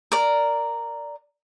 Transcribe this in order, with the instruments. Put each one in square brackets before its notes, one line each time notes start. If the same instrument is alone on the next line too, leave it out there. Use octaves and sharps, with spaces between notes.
[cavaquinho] A#4 D5